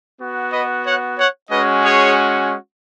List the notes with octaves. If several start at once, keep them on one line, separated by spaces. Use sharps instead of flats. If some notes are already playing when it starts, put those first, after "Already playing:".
B3 F#4
B4 D#5
C#5 F#5
C#5 F#5
G#3 C#4 F#4 B4 D#5
G#4 C#5